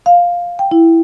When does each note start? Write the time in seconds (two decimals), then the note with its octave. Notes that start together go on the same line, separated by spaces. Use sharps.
0.06 F5
0.59 G5
0.71 E4